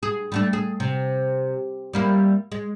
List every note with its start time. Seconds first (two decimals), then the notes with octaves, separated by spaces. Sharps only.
0.03 G#4
0.32 G3 A3 D4
0.53 G#4
0.80 C3
1.93 G3 A#3 E4
2.52 G#3